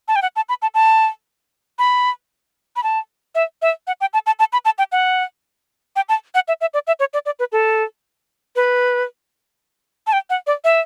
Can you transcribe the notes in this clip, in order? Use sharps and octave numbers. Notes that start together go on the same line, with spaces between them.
A5
G5
F#5
A5
B5
A5
A5
B5
B5
A5
E5
E5
F#5
G5
A5
A5
A5
B5
A5
G5
F#5
G5
A5
F#5
E5
E5
D5
E5
C#5
D5
D5
B4
A4
B4
A5
G5
F#5
D5
E5